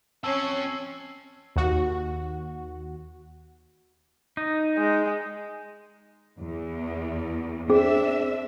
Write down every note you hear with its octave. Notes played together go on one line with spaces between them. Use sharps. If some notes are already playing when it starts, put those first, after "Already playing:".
C4 C#4 C#5 A5 E6 C7
D#2 F#4
D#4
G#3
E2
C4 D4 G#4 E5